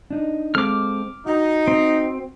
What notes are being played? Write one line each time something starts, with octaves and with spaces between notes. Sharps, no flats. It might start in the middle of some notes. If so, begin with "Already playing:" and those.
D4 D#4
G#3 C4 A4 D6 F6
D#4 F#4
C4